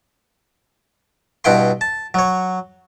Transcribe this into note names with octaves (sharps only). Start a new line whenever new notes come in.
G2 B2 E4 F#5 G5 C6
A5
F#3 C#5